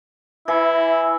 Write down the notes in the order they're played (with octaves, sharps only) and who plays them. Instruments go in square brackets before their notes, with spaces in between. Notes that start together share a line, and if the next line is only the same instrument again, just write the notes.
[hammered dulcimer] E3 [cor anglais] E4